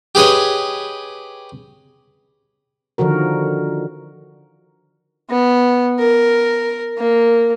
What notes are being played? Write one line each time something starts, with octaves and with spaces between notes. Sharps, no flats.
G4 G#4 B4 C#5 D#5
D3 D#3 F3 F#4 A#4
B3
A#4
A#3